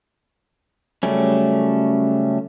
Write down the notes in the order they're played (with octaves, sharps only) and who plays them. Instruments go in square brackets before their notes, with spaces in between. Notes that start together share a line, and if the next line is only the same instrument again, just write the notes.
[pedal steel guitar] C#3 F#3 G3 A3 C#4